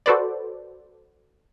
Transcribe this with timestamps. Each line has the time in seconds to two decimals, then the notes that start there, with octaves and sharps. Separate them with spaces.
0.06 F#4 A4 B4 C5 D5